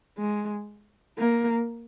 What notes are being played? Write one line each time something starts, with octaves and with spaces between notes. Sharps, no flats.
G#3
A#3